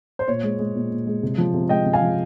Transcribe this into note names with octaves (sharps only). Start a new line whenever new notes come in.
C5
A#2 C#5
G#3
G#3
A#2
A#2
G#3
C3
F3
C3
G#3 D#5 G5
C3
F5 G#5
F3